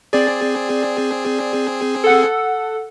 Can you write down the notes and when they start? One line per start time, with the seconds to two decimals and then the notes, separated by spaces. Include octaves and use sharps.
0.13 C4 G#4 D5
2.04 A4 F#5